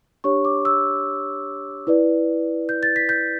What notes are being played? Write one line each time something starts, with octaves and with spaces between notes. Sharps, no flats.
D4 G4 C#5 C#6
D6
E6
E4 B4 D5
G6
A6
B6
G6